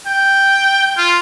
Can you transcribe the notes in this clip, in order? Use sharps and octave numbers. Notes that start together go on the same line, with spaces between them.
G5
F4